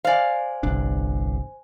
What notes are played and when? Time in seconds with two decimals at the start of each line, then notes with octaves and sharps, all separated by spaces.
0.05 C5 D5 F5 G#5
0.63 G1 C2 D4